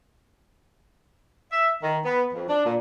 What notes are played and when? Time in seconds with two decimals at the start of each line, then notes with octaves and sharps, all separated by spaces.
1.52 E5
1.83 D#3
2.05 B3
2.34 F2
2.49 D4
2.66 A#2